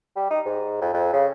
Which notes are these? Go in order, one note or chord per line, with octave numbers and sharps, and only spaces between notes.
G3
D#4
G#2
F2
F2
C#3